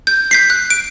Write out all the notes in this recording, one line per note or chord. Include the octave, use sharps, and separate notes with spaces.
G6
G6 B6 C7
F#6
D7